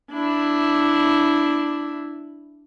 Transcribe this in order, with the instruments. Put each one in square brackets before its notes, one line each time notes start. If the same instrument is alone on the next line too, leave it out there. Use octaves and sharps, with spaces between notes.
[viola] D4 E4